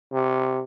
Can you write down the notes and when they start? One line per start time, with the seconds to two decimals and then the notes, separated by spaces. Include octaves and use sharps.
0.12 C3